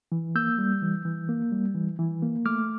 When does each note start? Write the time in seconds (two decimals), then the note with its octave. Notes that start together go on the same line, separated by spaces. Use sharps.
0.12 E3
0.35 A#3 E6 G6
0.59 G3
0.82 E3
1.05 E3
1.29 A#3
1.52 G3
1.75 E3
1.99 E3
2.22 A#3
2.46 A3 D6 F6